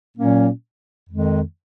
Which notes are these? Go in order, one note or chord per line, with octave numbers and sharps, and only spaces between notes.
A#2 F#3 A#3 C#4
F2 D#3 G#3